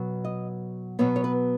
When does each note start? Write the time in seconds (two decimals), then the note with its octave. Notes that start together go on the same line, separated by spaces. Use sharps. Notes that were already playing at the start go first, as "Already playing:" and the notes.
Already playing: B2 F#3 B3
0.25 D#5
0.99 B2 F#3 B3 C#5
1.16 C#5
1.24 B4